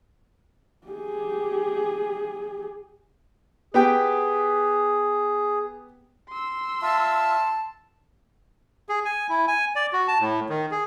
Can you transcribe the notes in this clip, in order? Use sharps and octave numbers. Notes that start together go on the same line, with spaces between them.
G4 G#4
B3 G4 G#4 G5
C6 E6
F4 E5 A5
G#4
G#5
E4
G#5
D5
F#4
A5
A2
D#3
G#4